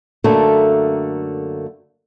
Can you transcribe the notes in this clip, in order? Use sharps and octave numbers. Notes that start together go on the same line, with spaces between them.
F#2 D3 A3 A#3